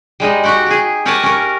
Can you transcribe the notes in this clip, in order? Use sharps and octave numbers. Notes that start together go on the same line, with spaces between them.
G3 G#3 D#4
F#4 G4 F#5
G4 G#4
G4 A#4 C#5 F#5 G#5 A5
C#4 A#4